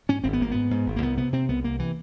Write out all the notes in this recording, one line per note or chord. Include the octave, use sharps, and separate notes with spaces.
G#2 C#4
G#1 C4
B3
G#1 A#3
G#2 B3
G#2
G#1
A#3
C2 B3
C3 B3
C3 C4
C2 B3
C2 A#3
C3 E3